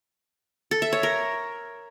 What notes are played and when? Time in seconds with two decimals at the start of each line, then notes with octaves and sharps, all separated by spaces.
0.71 A4
0.82 E5
0.93 C#5
1.03 A#4